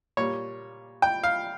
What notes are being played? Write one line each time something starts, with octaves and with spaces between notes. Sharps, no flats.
A#2 G3 C#5
G5
F5